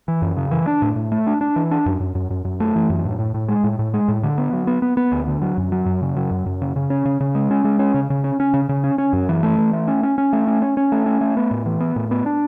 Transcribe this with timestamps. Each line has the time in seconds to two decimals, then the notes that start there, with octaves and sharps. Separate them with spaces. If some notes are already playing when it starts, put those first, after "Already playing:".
0.08 E3
0.22 F#2
0.37 C#3
0.51 E3
0.67 D4
0.82 A2
0.96 A2
1.12 A3
1.27 D4
1.41 D4
1.56 E3
1.71 D4
1.86 F#2
2.00 F#2
2.15 F#2
2.31 F#2
2.45 F#2
2.60 A3
2.75 E3
2.90 F#2
3.05 A2
3.19 A2
3.34 A2
3.48 G#3
3.64 A2
3.79 A2
3.94 G#3
4.08 A2
4.23 D3
4.38 B3
4.53 F#3
4.67 B3
4.82 B3
4.97 B3
5.12 D2
5.27 D3
5.42 F#3
5.58 F#2
5.72 F#3
5.86 F#2
6.02 C#3
6.16 F#3
6.31 F#2
6.46 F#2
6.62 C#3
6.76 C#3
6.90 C#4
7.06 C#3
7.21 C#3
7.35 G#3
7.51 C#4
7.64 G#3
7.79 C#4
7.94 C#3
8.10 C#3
8.24 C#4
8.40 C#4
8.54 C#3
8.69 C#3
8.84 C#4
8.98 C#4
9.13 F#2
9.29 E3
9.43 A3
9.58 E3
9.73 A3
9.88 C#4
10.03 C#4
10.18 C#4
10.33 A3
10.47 C#4
10.62 C#4
10.77 C#4
10.92 A3
11.06 C#4
11.21 A3
11.37 B3
11.51 A2
11.66 E3
11.80 B3
11.96 A2
12.11 B3
12.26 D4